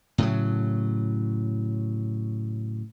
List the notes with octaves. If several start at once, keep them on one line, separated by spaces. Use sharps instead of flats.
A2 C#3 F#3